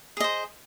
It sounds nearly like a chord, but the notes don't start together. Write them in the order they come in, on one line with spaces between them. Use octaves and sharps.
G#4 D#5 C5